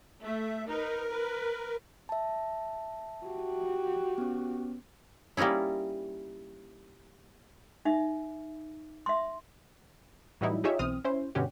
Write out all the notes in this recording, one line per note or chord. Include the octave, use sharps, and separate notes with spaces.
A3 E5
D#4 A#4 B4
B4
E5 A5
F#4 G4
B3 C#4
G3 A#3 C#4 D#4 E4
D#4 E5
E5 C6
A2 E3 F#3 G3 D#4 E4
D#4 F4 G4 G#4 C#5 E5
B1 E3 C4 D#6 F6
C#4 E4 C5
G2 B2 D3 C#4 F#4 G4